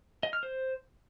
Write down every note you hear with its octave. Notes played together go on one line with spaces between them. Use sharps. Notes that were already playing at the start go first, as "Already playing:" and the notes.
D#5
F6
C5